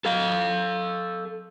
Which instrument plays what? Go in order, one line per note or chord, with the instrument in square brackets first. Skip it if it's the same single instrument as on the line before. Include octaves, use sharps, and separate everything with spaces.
[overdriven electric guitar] A4 F5